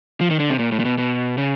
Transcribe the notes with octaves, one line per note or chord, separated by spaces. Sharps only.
F3
D#3
D3
C3
A#2
A2
A#2
B2
B2
C#3